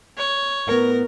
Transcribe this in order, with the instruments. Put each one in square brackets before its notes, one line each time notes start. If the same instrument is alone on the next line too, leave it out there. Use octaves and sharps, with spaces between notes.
[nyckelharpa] C#5
[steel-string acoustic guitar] A2 B3 [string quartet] A#4